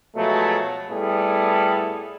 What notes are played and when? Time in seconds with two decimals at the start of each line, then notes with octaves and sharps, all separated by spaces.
0.16 B2 F3 F#3 G#3 A3
0.90 A2 G3 B3 E4 G#4 A4